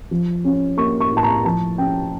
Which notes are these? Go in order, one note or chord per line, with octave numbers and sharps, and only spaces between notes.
F3
C#4
A#3 C#6
C#6
A2
A5
A#5
F3 A5
C#4 G5